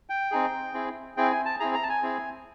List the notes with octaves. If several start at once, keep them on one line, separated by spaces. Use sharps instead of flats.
G5
C4 D#4 G#4
C4 E4 G#4
C4 E4 G#4 G5
G#5
A5
C4 E4 G#4 A#5
A#5
A5
G#5
C4 E4 G#4